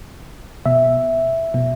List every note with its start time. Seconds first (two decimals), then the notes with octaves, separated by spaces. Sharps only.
0.66 B2 E5
1.54 B2